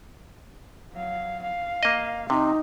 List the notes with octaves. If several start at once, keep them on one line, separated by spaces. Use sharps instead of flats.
F#3 F5
F5
A#3 D#5
C3 D#4